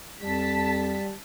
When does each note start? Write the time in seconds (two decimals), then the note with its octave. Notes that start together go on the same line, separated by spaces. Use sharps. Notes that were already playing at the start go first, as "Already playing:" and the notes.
0.22 F2 G3 A5 B6